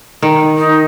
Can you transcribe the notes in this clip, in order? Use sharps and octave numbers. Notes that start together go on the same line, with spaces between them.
D#3
D#4